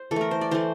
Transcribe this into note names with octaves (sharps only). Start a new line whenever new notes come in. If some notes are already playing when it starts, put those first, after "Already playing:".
Already playing: C5
E3 A4
A3 A#4
C5
D5
E3 A3 C5